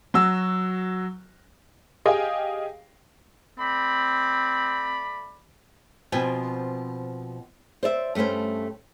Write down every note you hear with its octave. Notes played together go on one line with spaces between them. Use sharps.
F#3 F#4 E6
G4 G#4 D#5 F5 G5 G#5
A3 C4 D5 B5
B2 F3 C4 G5 G#5
C5 D5 E5
G2 A3 A#3 C#4 C5